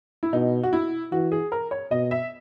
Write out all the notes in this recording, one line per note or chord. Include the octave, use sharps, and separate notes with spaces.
E4
B2 D#4
F#4
E4
E3 F#4
G#4
A#4
C#5
B2 D#5
E5